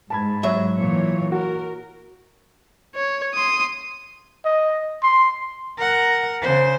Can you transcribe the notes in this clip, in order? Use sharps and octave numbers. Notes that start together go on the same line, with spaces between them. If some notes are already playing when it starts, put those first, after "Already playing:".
G#2 A5 B5 G#6
F#3 E5
A#2 E3 C#5
F#4 A#4
C#5
C6 D#6
D#5
C6
A#4 F#5
C#3 C5